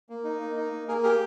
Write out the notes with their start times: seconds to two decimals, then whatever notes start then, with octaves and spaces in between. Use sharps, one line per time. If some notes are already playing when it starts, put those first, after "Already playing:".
0.09 A#3
0.24 D#4
0.41 A#3
0.56 D#4
0.72 A#3
0.88 A#3 G#4 A#4
1.03 G4 G#4 A#4